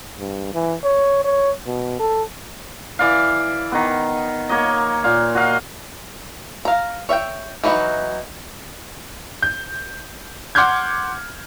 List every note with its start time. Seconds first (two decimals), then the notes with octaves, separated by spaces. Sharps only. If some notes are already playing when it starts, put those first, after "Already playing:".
0.19 G2
0.54 E3
0.84 C#5
1.24 C#5
1.66 B2
1.99 A4
2.99 E3 D5 F5
3.72 D#3 B3
4.49 A#3 C#5 D#5
5.04 A#2 F5
5.35 F#4 D#5 F5
6.65 F5 A#5
7.09 C#5 E5 F5 G5
7.64 E3 F#3 D#4 E4 F#4
9.42 G6
10.55 F#5 C6 D6 F6 G6 G#6